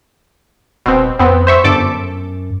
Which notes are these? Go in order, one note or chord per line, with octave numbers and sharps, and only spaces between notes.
D#1 B2 C4
F2 B3 C4
C5 E5 C#6
G1 F#2 A4 D6